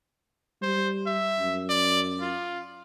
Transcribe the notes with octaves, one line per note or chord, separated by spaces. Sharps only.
G3 C5
E5
F#2
D5
F4